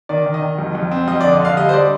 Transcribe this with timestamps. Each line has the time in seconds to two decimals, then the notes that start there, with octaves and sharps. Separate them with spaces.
0.09 D#3 D5
0.26 D#3
0.34 D#5
0.42 D#3
0.58 F2
0.75 F2
0.91 C4
1.08 F2 D#5
1.21 D3 D5
1.33 D#5
1.40 D3 F5
1.57 G3 D#5
1.69 C5
1.74 G3 D5